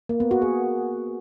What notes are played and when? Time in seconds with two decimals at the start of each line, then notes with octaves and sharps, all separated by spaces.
0.09 A#3
0.20 B3
0.31 F#4
0.42 G#4